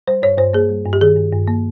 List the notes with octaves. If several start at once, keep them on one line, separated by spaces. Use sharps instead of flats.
G3 C5
G2 C#5
G2 C5
A#3 G#4
G3
G2
G4
D#3 G#4
G2
G2
A#3